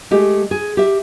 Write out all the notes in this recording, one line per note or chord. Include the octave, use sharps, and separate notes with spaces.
G#3 A3 G4
G#4
G4 E5